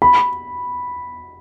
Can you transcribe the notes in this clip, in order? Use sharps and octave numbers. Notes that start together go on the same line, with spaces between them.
B5